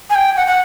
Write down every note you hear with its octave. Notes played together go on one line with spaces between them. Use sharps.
G#5
G5
F#5
F#5